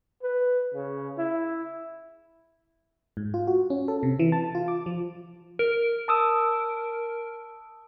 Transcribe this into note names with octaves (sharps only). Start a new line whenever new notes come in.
B4
C#3
E4
G#2
F4
F#4
C#4
A4
C3
E3
A5
F4
D6
F3
A#4
A5 D#6 E6